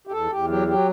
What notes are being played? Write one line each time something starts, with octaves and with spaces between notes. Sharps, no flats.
G4
E2 A4
E2 G4
F#3 G4
F#3 G4